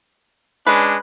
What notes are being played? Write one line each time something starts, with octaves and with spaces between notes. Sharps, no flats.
G#3 C#4 D4 B4